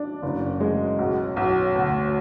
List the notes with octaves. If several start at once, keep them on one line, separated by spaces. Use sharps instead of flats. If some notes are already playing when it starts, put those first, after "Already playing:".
Already playing: D4
F#1
G#3
B1
B1
D2